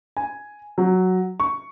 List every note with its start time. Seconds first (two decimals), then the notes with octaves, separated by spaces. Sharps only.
0.17 G#5
0.78 F#3
1.40 C#6